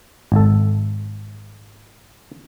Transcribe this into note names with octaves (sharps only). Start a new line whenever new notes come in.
G#1 A4